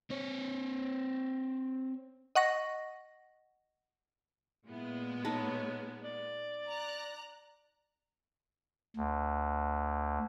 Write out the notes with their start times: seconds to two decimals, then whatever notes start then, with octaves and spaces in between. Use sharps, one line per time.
0.10 C4 C#5
2.35 D#5 F#5 C#6 A#6
4.66 A#2 G#3 B3 E4
5.25 D#4 A4 B4 C#5
6.02 D5
6.68 A#5 F#6
8.97 D2